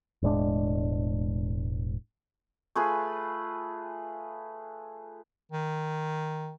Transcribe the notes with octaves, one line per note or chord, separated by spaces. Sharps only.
E1 A2 G#3 D4
A3 F4 G#4 B4
D#3